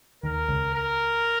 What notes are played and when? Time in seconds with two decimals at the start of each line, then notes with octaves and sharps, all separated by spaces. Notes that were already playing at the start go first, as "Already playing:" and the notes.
0.23 D#2 D#3 A#4
0.48 C#2 C#3
0.74 A#4